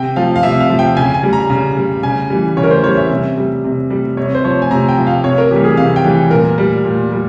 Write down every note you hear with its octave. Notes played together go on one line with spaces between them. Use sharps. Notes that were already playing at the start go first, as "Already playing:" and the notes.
Already playing: C3 G5
F3 F5
F5
C3 E5
F5
F3
G5
C#3 G#5
G#5
G3
A#5
C#3
G3
C#3 G#5
E3 G3
C#3 C#5
A#4
C5
E3 G3 C#5
E5
C3
G3
C3
G3
C3 C#5
C5
F3 C#5
G#5
C3 A#5
G5
F3
F5
C3 C#5
A#4
E3 G3 G4
G#4
C3 F5
G5
E3 G3
A#2 A#4
G3
A#2
G3